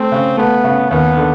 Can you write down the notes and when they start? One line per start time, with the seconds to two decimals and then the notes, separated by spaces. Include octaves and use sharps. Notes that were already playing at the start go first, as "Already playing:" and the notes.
Already playing: A3 C4
0.12 C#3
0.37 A3 B3
0.64 C#3
0.91 D#2 B3
1.17 D3